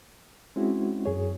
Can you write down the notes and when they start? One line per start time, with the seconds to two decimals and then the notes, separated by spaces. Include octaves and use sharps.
0.56 G#3 C4 C#4 E4 F#4
1.05 F#2 G#4 C#5